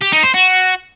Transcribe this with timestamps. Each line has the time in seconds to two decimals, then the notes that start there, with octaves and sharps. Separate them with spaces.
0.02 G4
0.13 D#4
0.23 C5
0.34 F#4